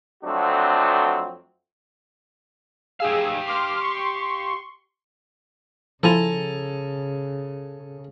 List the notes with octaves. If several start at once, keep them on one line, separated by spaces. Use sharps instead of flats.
F2 F#3 A3 C4 D4 F#4
G4 G#4 F5 E6
C6 D6 F6
C6 C#6
C#3 F3 E4 F4 A4 G#5 A#5